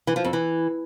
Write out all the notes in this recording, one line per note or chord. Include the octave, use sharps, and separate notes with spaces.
E3
F3
F2
E3